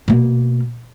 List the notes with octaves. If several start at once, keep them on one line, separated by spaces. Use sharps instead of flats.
B2 A#3